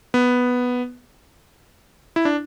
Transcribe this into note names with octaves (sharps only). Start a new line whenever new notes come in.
B3
E4
D4